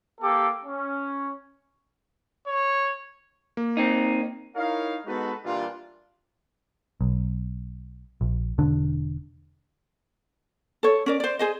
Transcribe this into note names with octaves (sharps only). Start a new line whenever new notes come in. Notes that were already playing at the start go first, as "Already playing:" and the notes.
A#3 G4 A4 D6
C#4
C#5
A#3
C4 D#4
D#4 E4 A#4 C#5 F5
G#3 B3 D#4 F#4 A4 B4
G2 A#2 E3 G3 D4 F4
B1
A#1
E1 D3 D4
A4 C#5
C#4 A#4 D5
C5 D5
G#4 C5 D#5